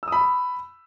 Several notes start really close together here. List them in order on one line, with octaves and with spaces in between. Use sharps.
E6 D#6 B5